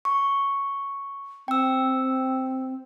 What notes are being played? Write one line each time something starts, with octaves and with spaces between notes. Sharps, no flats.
C#6
C4 G5 E6